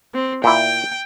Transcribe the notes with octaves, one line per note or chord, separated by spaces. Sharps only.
C4
A#2 E4 G5